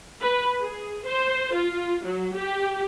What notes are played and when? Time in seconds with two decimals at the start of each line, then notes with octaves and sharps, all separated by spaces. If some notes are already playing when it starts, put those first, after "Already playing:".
0.21 B4
0.60 G#4
1.06 C5
1.54 F4
2.04 F#3
2.36 G4